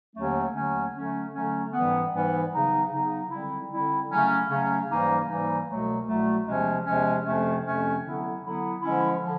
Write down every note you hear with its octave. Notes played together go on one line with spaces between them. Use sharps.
D#2 D3 F#3 A3 C#4
D#2 D3 F#3 A3 C#4
D3 F#3 A3 C#4
D3 F#3 A3 C#4
G#2 E3 G3 B3
G#2 E3 G3 B3
C#3 F#3 B3 D#4
C#3 F#3 B3 D#4
D3 G3 C4 E4
D3 G3 C4 E4
C#3 F#3 A3 C#4
C#3 F#3 A3 C#4
G#2 E3 G3 A#3 D#4
G#2 E3 G3 A#3 D#4
C2 B2 F#3 A3
C2 B2 F#3 A3
E2 C3 F3 G#3 C#4
E2 C3 F3 G#3 C#4
F2 C3 F3 A3 C#4
F2 C3 F3 A3 C#4
D3 F#3 B3 E4
D3 F#3 B3 E4
D3 F3 G#3 C#4 E4
D3 F3